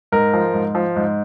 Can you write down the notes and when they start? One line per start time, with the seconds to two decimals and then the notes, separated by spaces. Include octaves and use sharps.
0.12 G#2 A#4
0.33 F3
0.54 G#2
0.75 F3
0.96 G#2